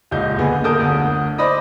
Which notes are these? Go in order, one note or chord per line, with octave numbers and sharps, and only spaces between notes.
D#1 C#2 D#5 G6
A#1 B2 D3 G#4 B4
A#2 D3 A#4 A5 D#6 G6
G1 D2 D3
C5 D5 D#5 B5 D#6 A#6